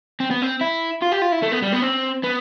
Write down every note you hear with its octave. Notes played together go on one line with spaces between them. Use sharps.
C4
B3
C4
E4
F4
G4
F4
E4
A3
B3
G3
B3
C4
B3